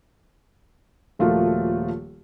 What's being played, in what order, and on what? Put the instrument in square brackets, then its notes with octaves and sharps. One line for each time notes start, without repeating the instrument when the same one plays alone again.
[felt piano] D#1 F3 A3 A#3 F4 F#4